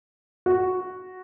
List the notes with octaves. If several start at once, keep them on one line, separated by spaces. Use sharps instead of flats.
F#4